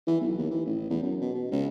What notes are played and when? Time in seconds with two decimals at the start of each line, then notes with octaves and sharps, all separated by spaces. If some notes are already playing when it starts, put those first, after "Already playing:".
0.07 E3
0.21 B1
0.38 D#2
0.51 E3
0.66 A1
0.90 E2
1.03 F#2
1.21 B2
1.34 B2
1.52 C#2